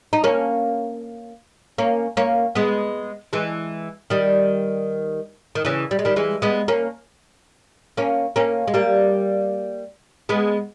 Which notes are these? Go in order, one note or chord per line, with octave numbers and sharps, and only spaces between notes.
D#4
A#3 C#4
A#3 C#4
A#3 C#4
G#3 B3
E3 G#3
D#3 G3
D#3
C#3 E3
G3
G#3
D#3 G3
E3 G#3
G#3 B3
A#3 C#4
A#3 C#4
A#3 C#4
G#3
G3 A#3
G#3 B3